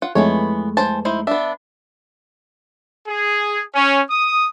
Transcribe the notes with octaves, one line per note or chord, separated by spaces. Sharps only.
F4 F#5
F2 E3 G#3 A3 B3 C#5
E3 C5 A5
D#4 E4 C5
B3 D4 E5
G#4
C#4
D#6